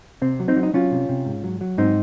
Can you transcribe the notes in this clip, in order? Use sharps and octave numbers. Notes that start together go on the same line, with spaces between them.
C3 C4
F#3
C4 D#4
F#3
D#4
F#3 C#4 F4
C3
C3
G#2
F#3
F#3
G#2 C4 D#4